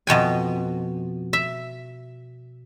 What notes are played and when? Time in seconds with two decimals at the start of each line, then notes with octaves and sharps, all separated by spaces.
0.07 F2 B2 G5 G#5
1.33 E5